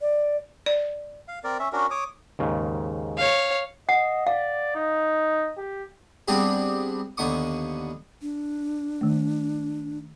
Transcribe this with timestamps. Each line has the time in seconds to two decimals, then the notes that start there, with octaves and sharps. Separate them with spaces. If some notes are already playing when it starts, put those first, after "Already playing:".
0.02 D5
0.66 D5
1.28 F5
1.44 C4 A#4 D5
1.59 C#4 E5
1.73 C#4 D4 F#4 A#4
1.91 C#5 D6 D#6
2.39 D#2 G#2 C#3
3.18 C#5 F5
3.89 D#5 F#5
4.27 D5 F5
4.76 D#4
5.57 G4
6.28 G3 B3 C4 D4 G4 G#4
7.17 D#2 D3 B3 C#6 D#6
8.22 D4
9.01 D#3 A3